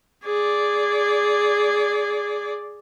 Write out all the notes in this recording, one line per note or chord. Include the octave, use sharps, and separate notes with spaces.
G#4 D5